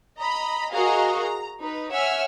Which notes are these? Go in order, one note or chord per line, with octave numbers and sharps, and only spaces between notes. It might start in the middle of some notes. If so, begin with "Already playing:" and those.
D#5 A#5 B5
F#4 G#4 A#4 D#5 F5 A#5
A#5
D#4 B4
C#5 E5 F#5 G#5 E6 F6